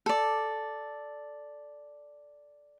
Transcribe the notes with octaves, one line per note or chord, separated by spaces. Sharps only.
A4 D5